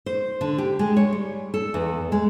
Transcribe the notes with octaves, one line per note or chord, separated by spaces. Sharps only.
C5
D3
G4
G#3
C#5
G3
A4
E2
G#3